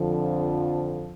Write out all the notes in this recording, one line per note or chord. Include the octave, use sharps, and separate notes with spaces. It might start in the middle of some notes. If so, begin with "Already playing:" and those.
Already playing: F2 D3 F3